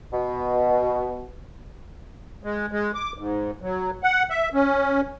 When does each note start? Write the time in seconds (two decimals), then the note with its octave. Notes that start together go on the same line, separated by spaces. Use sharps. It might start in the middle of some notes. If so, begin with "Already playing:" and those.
0.13 B2
2.44 G#3
2.72 G#3
2.95 D6
3.18 G#2
3.62 F#3
4.03 F#5
4.30 E5
4.54 C#4